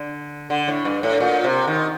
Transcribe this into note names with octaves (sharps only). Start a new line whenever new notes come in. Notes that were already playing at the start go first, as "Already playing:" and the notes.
Already playing: D3
D3
A2
G2
A2
A#2
C3
D#3